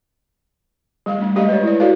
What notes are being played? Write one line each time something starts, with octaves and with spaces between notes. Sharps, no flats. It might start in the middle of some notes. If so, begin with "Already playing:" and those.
G3 F5
A3 D4
G#3 D4 G4 D5 D#5 F5
B4 C#5
E4 D5
F#4 A4 B4 C#5 D5 F5